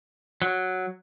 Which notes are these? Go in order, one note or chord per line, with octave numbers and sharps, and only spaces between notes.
F#3